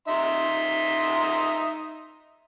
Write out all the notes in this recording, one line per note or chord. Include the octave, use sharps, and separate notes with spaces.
D#4 E5 C6